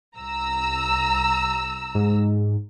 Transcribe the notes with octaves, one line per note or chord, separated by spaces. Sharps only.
C2 A#5 E6
G#2